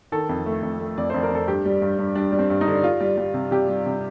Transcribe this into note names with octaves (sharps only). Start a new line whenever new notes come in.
D#3 A4
F2
A3
F2
A3
F2 D5
F2 C5
A#4
F2 A4
G2 G4
G3
G2
G2
G3 D4
G3
C4
G2
D#4
D3
G3 F4
G3
G3
C3
C3 G4
G3
C3